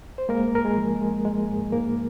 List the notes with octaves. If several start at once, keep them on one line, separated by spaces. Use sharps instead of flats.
C5
G#3 A#3 A#4
G#2 A#4
G#3 G#4
F3
G#3
G#3
G#2
G#2 A#3 A#4